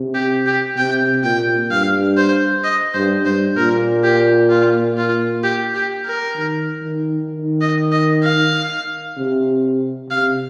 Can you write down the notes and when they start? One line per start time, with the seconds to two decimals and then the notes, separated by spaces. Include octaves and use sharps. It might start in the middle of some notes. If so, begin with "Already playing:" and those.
Already playing: C3
0.14 G4
0.46 G4
0.77 C3 G5
1.23 A#2 G5
1.71 G2 F5
2.17 C5
2.64 D#5
2.94 G2 C5
3.25 G2 C5
3.57 A#2 A#4
4.03 G4
4.49 F4
4.97 F4
5.43 G4
5.74 G4
6.06 A#4
6.36 D#3
6.83 D#3
7.30 D#3
7.61 D#5
7.92 D#5
8.23 F5
9.17 C3
10.10 C3 F5